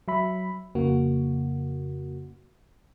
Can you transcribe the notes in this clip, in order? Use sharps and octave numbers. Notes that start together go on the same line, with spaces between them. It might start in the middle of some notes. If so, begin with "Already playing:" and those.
F#3 E5 B5
F2 C#3 A#3 F#4